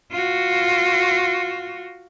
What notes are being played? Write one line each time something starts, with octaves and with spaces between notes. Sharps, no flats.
F4 F#4